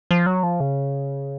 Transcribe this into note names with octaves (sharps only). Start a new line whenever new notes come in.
F3
F#3
F3
C#3